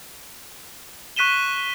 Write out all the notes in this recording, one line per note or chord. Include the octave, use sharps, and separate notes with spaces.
C#6 F#6 B6 D#7 E7 G7